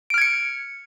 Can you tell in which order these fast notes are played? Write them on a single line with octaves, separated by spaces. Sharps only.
D7 F6 G#6 C#7